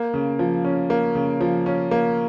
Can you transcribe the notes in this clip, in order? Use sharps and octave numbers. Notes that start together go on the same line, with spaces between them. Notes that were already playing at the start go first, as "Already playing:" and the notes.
Already playing: A#3
C#3
F3
C#4
A#3
C#3
F3
C#4
A#3